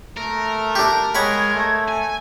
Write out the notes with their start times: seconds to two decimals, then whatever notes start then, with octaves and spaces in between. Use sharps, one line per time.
0.17 A3 A#4
0.75 D4 G4
1.15 G#3 C#5 F#5 B5 G#6
1.55 A3
1.89 G#5